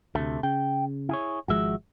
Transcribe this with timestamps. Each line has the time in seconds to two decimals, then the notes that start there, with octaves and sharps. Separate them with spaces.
0.15 D2 C3 A3
0.43 C#3 G5
1.09 E4 G#4 C#5
1.48 G#1 F3 G#3 F#4 E5